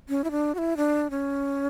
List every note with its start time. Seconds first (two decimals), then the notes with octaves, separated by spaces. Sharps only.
0.09 C#4
0.24 E4
0.31 D4
0.55 F#4
0.58 E4
0.77 D4
1.10 C#4